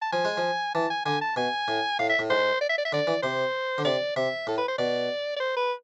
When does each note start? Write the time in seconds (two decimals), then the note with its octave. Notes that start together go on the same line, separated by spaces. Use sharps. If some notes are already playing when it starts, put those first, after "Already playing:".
0.02 A5
0.13 F3 G#5
0.25 G#3
0.37 F3
0.75 E3 A5
0.90 G#5
1.06 D3 G#5
1.21 A5
1.36 B2 G#5
1.68 A2
1.99 A2 F5
2.10 E5
2.19 A2
2.30 G#2 C5
2.61 D5
2.70 E5
2.78 D5
2.85 E5
2.93 D3 D5
3.07 E3
3.23 C3 C5
3.78 D3
3.85 C3 D5
4.16 C3 E5
4.47 A2 A4
4.58 B4
4.68 C5
4.78 B2 D5
5.37 D5
5.40 C5
5.56 B4